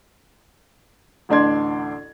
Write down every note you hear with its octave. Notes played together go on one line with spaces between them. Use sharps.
A1 D2 D4 D5 C6 G#6